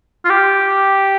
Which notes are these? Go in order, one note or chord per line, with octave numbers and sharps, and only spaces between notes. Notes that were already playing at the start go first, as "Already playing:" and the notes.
F4
G4